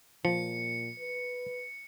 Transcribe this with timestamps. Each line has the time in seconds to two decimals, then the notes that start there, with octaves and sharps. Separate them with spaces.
0.25 A#2 F3 C#7
0.99 B4